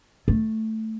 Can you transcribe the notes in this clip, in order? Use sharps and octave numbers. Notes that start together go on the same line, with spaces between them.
A3